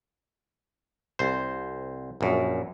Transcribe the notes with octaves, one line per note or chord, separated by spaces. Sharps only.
C2 C5
A#1 F#2